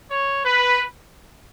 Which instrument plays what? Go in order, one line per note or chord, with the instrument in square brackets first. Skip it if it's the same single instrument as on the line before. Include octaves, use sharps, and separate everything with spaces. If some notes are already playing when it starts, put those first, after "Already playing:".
[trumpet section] C#5
B4